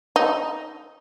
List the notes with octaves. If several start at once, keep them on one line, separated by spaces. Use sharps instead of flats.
D#4